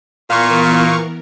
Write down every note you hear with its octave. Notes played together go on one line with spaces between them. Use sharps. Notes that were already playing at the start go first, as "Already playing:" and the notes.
A#2 E3 B3 A#4 F5 C#6